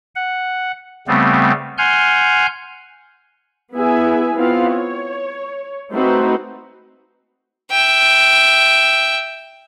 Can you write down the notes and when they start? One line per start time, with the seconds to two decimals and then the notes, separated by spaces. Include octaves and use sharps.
0.15 F#5
1.08 C#3 G3 A3 B3 C4
1.78 F#5 G#5 C6 F6 G6
3.74 B3 E4 G#4 B4 E5 G#5
4.36 B3 C4 E4 F4 F5
4.71 C#5
5.92 A3 C4 D#4 F#4 B4 C5
7.71 E5 G5